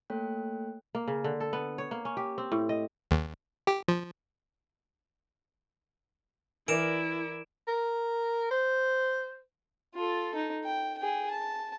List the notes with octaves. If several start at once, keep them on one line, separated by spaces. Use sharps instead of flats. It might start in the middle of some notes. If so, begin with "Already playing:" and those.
A3 A#3 A4 C#5 G5 F#6
A#3
C#3
D3
A4
B3
C#5
A#3
C#4
G4
C4
A2
D#5
D#2
G4
F3
E3 E4 A#4 D5 D7 E7
A#4
C5
F4 A4
D#4
G5
G#4 G5
A5